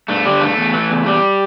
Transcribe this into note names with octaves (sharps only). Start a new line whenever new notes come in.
G2 A3
D3 G3
G2 A3
E2
E3
E2
E2 G3